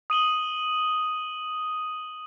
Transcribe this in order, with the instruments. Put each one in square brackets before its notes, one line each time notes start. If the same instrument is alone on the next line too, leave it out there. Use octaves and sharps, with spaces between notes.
[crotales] D#6 D#7 F#7 G7